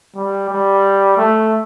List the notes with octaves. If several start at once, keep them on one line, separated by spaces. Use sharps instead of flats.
G3
G3
A3